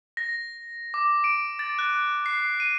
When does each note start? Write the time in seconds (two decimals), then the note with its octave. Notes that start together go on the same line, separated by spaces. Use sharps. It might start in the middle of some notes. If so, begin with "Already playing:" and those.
0.17 A#6
0.94 D6
1.24 D7
1.59 A6
1.79 F#6
2.26 C7
2.60 D#7